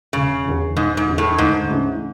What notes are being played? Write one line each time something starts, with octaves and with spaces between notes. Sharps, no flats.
E1 C#3
E2 D3
E1 G#2
G#2
E2 D3
A2
D2 G#2
C#3 E3 A3 D4